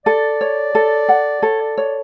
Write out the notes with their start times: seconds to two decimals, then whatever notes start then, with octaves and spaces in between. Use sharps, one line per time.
0.06 A4 D5
0.41 C#5
0.75 A4
1.09 F#5
1.43 A4 C#5
1.60 D5
1.78 C#5 D5